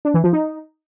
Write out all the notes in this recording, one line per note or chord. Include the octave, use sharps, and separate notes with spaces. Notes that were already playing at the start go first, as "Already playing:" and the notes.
D4
E3
F3
D#4